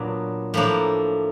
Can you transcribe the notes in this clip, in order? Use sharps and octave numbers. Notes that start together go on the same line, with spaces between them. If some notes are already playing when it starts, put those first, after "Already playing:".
Already playing: A#2 F#3 B3 D4
A2 F3 A#3 D4